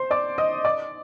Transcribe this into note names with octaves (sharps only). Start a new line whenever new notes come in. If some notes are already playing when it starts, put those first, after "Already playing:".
Already playing: C5 C6
D5 D6
D#5 D#6
D5 D6